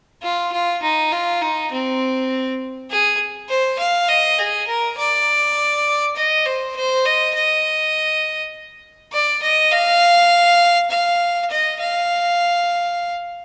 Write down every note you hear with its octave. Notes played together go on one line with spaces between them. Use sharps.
F4
F4
D#4
F4
D#4
C4
G#4
C5
F5
D#5
G#4
A#4
D5
D#5
C5
C5
D#5
D#5
D5
D#5
F5
F5
D#5
F5